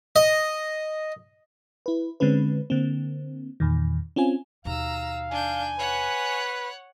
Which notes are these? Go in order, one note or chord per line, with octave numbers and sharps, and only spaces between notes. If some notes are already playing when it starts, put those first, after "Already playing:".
D#5
E4 B4
D3 G#3 C4 C#4 B4
D3 A#3 C4
E2 A#2 D#3
C4 C#4 F4 G#5
D#2 B2 F5 A#5 E6
D4 G#5 G6
B4 C#5 F#5